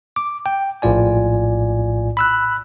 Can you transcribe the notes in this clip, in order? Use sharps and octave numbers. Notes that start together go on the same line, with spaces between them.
D6
G5
A#1 A2 F4 D5 G#5
B5 E6 F#6